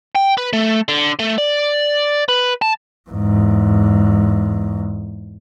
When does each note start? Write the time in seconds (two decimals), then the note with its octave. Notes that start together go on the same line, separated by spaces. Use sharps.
0.15 G5
0.37 B4
0.53 A3
0.89 D3
1.19 A3
1.38 D5
2.29 B4
2.62 A5
3.10 E2 G#2